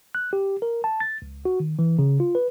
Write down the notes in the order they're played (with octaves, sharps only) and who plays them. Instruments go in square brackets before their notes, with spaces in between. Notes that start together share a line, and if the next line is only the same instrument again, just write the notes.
[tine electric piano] F#6
G4
A#4
A5
A6
C#2
F#4
D#3
E3
C#3
F4
B4